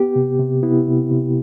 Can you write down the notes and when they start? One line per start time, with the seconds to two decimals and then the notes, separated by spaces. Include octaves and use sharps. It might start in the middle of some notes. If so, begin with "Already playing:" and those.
Already playing: B3 G4
0.16 C3
0.39 C3
0.63 B3 E4
0.87 C3
1.11 C3